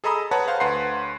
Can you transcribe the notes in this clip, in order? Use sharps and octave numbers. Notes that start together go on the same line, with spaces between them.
G#4 A4 D#5 A#5 B5 D#6
B4 C#5 F#5 A5 A#5
C5 F5
D2 B4 F#5 C6 C7